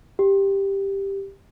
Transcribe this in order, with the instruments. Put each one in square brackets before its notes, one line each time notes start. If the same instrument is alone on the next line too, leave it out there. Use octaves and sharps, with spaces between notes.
[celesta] G4